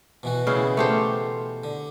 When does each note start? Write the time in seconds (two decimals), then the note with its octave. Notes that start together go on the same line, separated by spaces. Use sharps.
0.23 B2 E3 F#4
0.47 C#3 E4 G#4
0.77 A3 G4 C5
1.64 D3